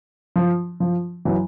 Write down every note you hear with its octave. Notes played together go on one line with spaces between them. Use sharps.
F3
F3
E3 F#3